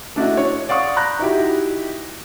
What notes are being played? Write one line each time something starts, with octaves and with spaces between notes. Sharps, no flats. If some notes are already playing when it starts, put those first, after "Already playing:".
A3 D4 E4 F#4 D#5
C#5
D5 F5 F#5 C#6 D#6
A#5 B5 F#6 G6 A#6
D#4 E4 F#4 G4